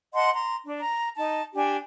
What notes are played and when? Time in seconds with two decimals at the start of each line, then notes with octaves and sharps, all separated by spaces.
0.14 D#5 F#5 A5 C6
0.33 A#5 C6
0.65 D4 D5
0.80 A#5
1.16 D#4 A5
1.55 D4 G4 G#5